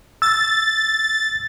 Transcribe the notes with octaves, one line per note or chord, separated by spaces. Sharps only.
E6 A6